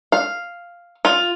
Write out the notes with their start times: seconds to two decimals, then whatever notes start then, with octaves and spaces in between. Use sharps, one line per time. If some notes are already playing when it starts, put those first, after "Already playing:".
0.12 F5
1.05 F4